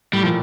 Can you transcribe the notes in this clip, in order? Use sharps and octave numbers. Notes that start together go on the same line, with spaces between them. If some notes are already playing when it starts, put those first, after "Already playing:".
A2 G3
A#2 F3